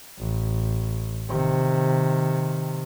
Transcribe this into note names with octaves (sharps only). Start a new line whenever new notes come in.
A1
C3 D#3